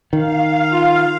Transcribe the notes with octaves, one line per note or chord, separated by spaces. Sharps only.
D#3 F5
F4